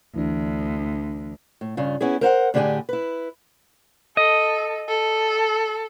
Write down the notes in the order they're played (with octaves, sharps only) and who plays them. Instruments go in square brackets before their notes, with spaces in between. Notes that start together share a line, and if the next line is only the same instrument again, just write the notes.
[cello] D2 [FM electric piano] E3 D4
[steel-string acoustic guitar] A2
G2 C#3 F4
B3 C#4 E4 G#4
A#4 C5 F5 F#5
A2 D3 D4 G4 G#4 G#5
E4 B4
[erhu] A4 [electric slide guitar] D#5
[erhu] A4